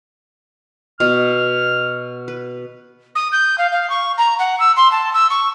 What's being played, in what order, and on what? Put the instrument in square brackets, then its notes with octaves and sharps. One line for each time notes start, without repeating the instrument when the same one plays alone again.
[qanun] B2 [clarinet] F6
[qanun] B4
[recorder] D#6
G6
F5
F5
C#6
A#5
F#5
E6
C6
A5
E6
C#6